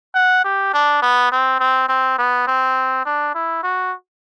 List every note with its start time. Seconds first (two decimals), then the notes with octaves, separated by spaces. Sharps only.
0.15 F#5
0.44 G4
0.74 D4
1.02 B3
1.32 C4
1.60 C4
1.89 C4
2.19 B3
2.47 C4
3.05 D4
3.35 E4
3.63 F#4